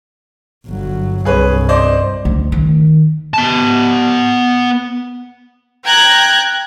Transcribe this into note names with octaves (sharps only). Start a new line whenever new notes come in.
G1 F#3
C2 G2 G#4 B4 C#5
C5 D5 D#5
D2
D#3
B3 A5
G5 A#5 F#6 G#6